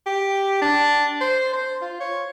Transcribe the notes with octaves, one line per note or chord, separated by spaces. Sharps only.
G4
D4
C5
C5
F4
C#5